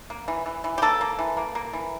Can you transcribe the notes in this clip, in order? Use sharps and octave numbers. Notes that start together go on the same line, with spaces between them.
A#3
E3
E3
E3
G4
A#3 A4
A#3
E3
A#3
A#3
E3